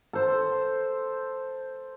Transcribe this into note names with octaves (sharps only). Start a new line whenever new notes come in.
A4 C5